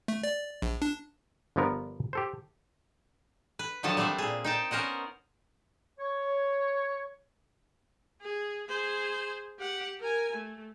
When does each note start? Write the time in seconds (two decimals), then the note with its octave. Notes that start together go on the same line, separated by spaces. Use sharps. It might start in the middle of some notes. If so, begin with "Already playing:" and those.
0.08 A3
0.24 D5
0.62 A#1
0.82 D4
1.56 G1 D3 F3 B3 A#4
2.13 G4 A4 C5
3.59 B4
3.83 D3 D#3 F3 F#3 D#5 A5
3.97 G3 A3 C4 D4 C5 E5
4.18 A#2 G#4
4.44 D#4 G5 A5
4.71 B3 C#4 A#4 C5 D#5 F#5
5.99 C#5
8.21 G#4
8.67 G#4 C5
9.59 G4 F#5
10.00 A#4 G#5
10.33 A3